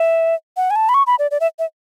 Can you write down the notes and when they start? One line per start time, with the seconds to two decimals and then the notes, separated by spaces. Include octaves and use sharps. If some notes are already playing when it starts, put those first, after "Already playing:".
Already playing: E5
0.57 F#5
0.70 G#5
0.76 A5
0.89 B5
0.94 C#6
1.07 B5
1.19 D5
1.31 D5
1.40 E5
1.59 E5